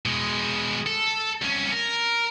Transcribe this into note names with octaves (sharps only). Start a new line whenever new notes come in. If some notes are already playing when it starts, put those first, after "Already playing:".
B2 G#3
A4
C2 C#4
A#4